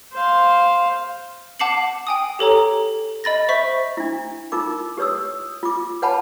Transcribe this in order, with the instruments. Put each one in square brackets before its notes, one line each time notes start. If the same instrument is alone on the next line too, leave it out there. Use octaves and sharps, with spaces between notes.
[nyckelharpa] C5 F5
[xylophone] F#5 A5 D6 C7 C#7 F#7
G5 G#5 D#6
G4 A4 C#5 A#5
D#5 B5 A6 A#6
C5 E5 C#6 B6
[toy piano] D4 E4
D#4 F4 A#4 D6
G4 B4 C#5 D#6 E6
F4 D6
B4 C#5 F#5 G#5 A5 B5